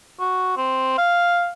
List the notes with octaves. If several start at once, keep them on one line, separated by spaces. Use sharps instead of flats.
F#4
C4
F5